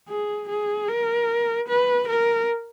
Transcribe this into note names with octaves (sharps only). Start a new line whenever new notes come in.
G#4
G#4
A#4
B4
A#4